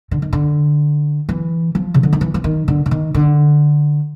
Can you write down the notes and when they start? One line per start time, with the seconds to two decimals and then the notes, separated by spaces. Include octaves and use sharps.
0.11 D3
0.22 D#3
0.33 D3
1.29 E3
1.75 F3
1.94 C#3
2.03 D3
2.13 D#3
2.21 E3
2.34 E3
2.44 D#3
2.68 D3
2.86 D3
2.91 D#3
3.14 D3